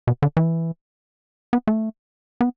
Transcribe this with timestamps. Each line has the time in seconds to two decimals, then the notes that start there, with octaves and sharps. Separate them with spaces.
0.07 B2
0.22 D3
0.37 E3
1.53 B3
1.67 A3
2.41 B3